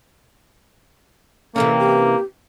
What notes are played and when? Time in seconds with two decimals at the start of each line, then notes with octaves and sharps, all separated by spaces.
1.56 C3 E3 A#3 C#4 A4
1.80 G4